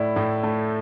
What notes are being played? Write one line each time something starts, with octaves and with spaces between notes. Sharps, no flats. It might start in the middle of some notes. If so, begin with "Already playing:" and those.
Already playing: A2 E4 D5
A2
A3